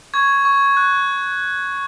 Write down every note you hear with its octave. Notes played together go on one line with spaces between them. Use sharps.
C#6 G#6
C#6
F#6